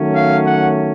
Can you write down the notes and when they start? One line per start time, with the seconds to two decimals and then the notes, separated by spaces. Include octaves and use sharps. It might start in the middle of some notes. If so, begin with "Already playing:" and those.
Already playing: D#3 F#3 A3 C#4
0.16 F5
0.47 F#5